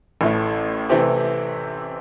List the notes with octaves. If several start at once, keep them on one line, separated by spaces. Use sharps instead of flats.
A1 A2 A3 E4
C3 E3 A3 C4 G4